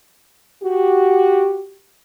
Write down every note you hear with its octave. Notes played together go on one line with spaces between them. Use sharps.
F#4 G4